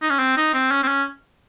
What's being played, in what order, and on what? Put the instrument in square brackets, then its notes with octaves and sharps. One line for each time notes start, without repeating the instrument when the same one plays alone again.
[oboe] D#4
C#4
C4
D#4
C4
C#4
C4
C#4